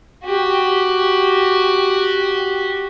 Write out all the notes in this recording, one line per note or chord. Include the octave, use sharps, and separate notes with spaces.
F#4 G4